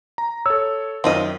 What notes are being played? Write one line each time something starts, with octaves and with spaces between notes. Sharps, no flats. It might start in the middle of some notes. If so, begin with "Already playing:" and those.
A#5
A4 C#5 E6
F#2 D#3 C4 F4 D#5